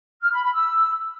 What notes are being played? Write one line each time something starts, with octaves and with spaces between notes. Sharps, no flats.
F6
B5
B5
E6